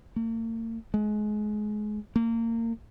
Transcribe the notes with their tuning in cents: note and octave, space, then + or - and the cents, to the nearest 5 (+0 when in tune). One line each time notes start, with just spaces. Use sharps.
A#3 -45
G#3 +25
A#3 -30